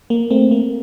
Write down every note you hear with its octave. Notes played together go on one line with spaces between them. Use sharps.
A#3
A3 C4
A#3